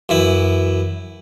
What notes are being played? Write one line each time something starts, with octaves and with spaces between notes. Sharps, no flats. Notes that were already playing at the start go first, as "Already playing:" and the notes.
F#2 E3 E4